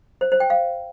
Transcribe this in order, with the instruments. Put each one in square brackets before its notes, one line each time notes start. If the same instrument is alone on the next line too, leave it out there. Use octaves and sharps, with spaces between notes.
[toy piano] C5
C5
G5
F5